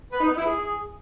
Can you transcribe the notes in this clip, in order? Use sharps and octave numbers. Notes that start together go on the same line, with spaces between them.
B4
D#4
B3
E4
G#4